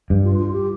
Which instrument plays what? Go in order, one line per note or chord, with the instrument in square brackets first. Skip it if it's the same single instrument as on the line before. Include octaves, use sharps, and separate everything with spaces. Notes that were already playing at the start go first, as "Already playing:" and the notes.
[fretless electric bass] G2
[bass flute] F4
F4
G4